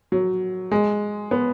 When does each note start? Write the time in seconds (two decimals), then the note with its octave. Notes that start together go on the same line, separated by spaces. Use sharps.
0.12 F#3
0.72 G#3
1.31 B3